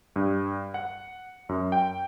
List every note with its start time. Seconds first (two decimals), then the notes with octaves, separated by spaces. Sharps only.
0.16 G2
0.74 F#5
1.49 F#2
1.72 G5